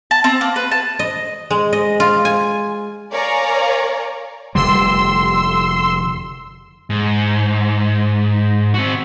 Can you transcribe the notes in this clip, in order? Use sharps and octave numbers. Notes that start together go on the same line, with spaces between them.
A5
C4
A#3
B4
A5
D#5
G#3
D#5
F4
G#5
A#4 C#5 D5 F5 G#5 A#5
F1 D3 G3 C6 E6
G#2
C4 F#4